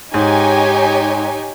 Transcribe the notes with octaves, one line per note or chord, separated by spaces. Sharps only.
G#2 D#4 G4 C#5 G#5